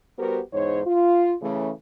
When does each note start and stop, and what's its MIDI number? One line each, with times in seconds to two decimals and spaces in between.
0.18 0.40 55
0.18 0.40 59
0.18 0.40 66
0.18 0.40 67
0.18 0.40 70
0.18 0.40 72
0.53 0.80 40
0.53 0.80 44
0.53 0.80 63
0.53 0.80 72
0.53 0.80 73
0.85 1.34 65
1.41 1.70 49
1.41 1.70 52
1.41 1.70 57